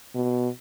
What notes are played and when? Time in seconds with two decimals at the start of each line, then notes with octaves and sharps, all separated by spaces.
0.15 B2